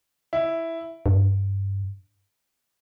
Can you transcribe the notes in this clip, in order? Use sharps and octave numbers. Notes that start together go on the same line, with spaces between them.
E4
G2